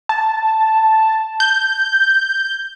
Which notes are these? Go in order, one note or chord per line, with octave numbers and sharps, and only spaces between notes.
A5
G6